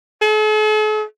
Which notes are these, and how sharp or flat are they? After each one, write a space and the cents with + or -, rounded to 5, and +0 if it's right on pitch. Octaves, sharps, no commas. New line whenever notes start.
A4 -45